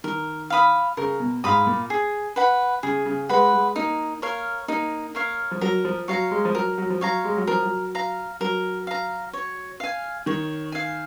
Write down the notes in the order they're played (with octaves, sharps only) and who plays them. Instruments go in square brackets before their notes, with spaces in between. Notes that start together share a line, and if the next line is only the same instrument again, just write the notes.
[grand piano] D#3 [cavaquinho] A#4
[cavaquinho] F5 B5 D#6
[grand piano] C#3 [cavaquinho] A#4
[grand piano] B2
[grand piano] G#2 [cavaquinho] F5 B5 D#6
[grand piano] A#2
[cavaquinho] G#4
B4 F#5 B5
[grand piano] C#3 [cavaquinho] G#4
[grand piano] C#3
[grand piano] G#3 [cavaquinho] B4 F#5 B5
[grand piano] G#3
[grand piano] A#3 [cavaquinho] D#4
[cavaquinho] A#4 C#5 F5
[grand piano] A#3 [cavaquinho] D#4
[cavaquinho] A#4 C#5 F5
[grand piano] F3
[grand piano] F#3 [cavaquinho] A#4
[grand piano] F3
[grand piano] F#3 [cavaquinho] C#5 F5 A#5
[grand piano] G#3
F3
[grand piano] F#3 [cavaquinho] A#4
[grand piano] F#3
F3
[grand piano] F#3 [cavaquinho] C#5 F5 A#5
[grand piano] G#3
F#3
[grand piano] F3 [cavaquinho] A#4
[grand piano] F#3
[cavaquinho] F5 A#5
[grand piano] F#3 [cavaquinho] A#4
[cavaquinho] F5 A#5
C#5
F5 G#5
[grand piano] D#3 [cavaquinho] C#5
[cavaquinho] F5 G#5